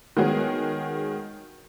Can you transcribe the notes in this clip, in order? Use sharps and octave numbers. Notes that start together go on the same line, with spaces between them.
D#3 G#3 B3 F#4 G#4 C#5